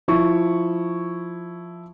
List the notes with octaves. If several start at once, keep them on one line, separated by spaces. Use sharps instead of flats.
F3 E4 C#6